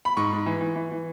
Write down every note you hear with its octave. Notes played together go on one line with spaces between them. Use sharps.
B5
G#2 C#6
G#2
E3
E3
E3
E3